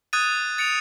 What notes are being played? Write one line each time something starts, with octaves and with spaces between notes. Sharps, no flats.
D#6 F#6 G#6 A6 D#7
A6 C#7 D7 F7